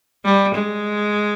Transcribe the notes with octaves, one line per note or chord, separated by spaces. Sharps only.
G3
G#3